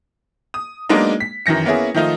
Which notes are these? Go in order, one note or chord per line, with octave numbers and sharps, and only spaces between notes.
D#6
F#3 G#3 A#3 B3 D4 D#4
B6
F#2 D#3 E3 A#6 C#7
A#3 B3 C#4 E4 G#4
D#3 F3 A3 D#4 F4